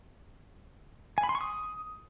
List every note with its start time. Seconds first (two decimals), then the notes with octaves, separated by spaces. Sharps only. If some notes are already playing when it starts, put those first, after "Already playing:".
1.18 G#5
1.23 B5
1.29 C6
1.35 C#6
1.41 D#6